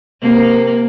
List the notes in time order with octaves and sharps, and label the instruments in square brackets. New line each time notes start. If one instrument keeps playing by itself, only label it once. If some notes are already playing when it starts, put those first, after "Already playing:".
[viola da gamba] C3 A#3